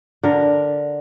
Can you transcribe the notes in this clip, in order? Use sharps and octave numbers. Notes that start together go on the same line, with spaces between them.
D3 A#4